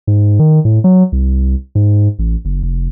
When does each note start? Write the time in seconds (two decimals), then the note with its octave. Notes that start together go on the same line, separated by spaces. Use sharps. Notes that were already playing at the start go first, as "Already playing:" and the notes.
0.07 G#2
0.39 D#3
0.65 A2
0.84 F#3
1.12 C2
1.75 G#2
2.19 A1
2.45 F#1
2.63 F1